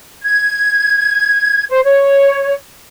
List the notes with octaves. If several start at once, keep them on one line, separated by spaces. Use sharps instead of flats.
G#6
C5
C#5